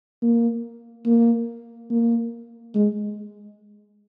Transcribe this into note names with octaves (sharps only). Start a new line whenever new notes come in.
A#3
A#3
A#3
G#3